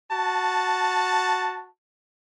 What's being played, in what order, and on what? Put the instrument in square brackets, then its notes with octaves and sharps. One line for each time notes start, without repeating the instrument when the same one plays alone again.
[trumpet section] F#4 A5